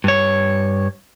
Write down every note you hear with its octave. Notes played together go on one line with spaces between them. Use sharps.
G2 C#5